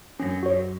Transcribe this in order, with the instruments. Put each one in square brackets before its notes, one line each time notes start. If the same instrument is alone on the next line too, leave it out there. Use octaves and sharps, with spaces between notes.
[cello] F#2 [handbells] C#4
[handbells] F#4 C#5